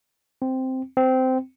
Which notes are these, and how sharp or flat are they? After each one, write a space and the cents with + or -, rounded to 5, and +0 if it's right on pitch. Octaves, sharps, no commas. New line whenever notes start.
C4 -5
C4 -15